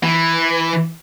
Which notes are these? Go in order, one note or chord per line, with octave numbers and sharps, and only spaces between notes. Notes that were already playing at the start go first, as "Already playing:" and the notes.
E3